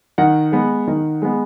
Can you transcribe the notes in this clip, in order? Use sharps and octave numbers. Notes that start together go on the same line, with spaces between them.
D#3 F#5
G#3 B3
D#3
G#3 B3